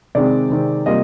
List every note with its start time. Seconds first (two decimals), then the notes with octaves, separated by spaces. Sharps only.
0.15 C3 D#3 G#3 C4 D5
0.50 C3 D#3 G#3 C4
0.86 C3 G3 A#3 F4 D#5